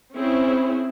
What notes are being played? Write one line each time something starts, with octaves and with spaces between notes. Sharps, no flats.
C4 C#4 E4 G#4